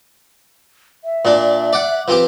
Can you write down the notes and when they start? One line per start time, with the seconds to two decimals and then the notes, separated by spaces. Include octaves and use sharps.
1.04 E5
1.25 A#2 D4
1.73 D5 F#5
2.08 F3 C4 G4 B4